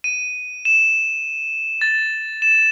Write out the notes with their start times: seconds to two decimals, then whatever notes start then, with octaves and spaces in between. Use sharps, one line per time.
0.04 D#7
0.65 E7
1.81 A6
2.42 E7